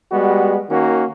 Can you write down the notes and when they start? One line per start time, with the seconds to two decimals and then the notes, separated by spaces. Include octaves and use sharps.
0.12 G3 G#3 B3 F#4
0.70 D#3 A#3 C#4 F#4